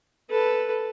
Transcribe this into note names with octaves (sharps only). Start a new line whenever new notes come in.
A4 B4